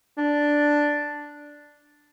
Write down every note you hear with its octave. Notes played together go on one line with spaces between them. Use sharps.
D4